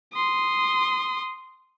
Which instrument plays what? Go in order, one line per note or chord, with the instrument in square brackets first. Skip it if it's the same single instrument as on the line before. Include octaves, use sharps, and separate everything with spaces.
[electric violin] C6 D#6